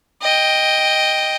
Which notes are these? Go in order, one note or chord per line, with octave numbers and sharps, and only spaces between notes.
D#5 G5